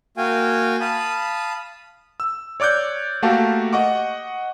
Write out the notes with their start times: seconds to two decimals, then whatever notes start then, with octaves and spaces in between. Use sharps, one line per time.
0.17 A#3 F#4 F5 G5 G#5
0.81 F5 A5 B5 D#6
2.20 E6
2.60 C#5 D5 D6 F#6 G6
3.23 A3 A#3 F#4 G4 F5 A5
3.73 D#5 F#5 C#6 D6